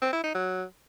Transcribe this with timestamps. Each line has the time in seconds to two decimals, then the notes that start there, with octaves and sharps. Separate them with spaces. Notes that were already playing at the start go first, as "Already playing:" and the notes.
0.02 C4
0.13 E4
0.24 D#4
0.35 F#3